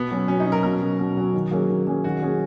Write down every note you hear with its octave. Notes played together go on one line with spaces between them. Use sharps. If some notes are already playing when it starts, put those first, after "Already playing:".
Already playing: B2 B3
F#3 C#4
B2 C#4
D#4
F#3 C#4
A#4
B2 A#4
F#3 C#4
B2
F#3 C#4
D#3
F#3 A#3 C#4 G#4
D#3
F#3 A#3 C#4 G#4
D#3 F#4
F#3 A#3 C#4 G#4